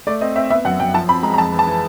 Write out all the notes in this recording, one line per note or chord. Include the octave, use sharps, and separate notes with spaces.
A3 D5
C4 D#5
C4 E5
B3 E5
F#2 F#5
F#2 G5
F3 A5
C4 B5
G#3 A#5
A#5
F2 A5
E3
A5
E3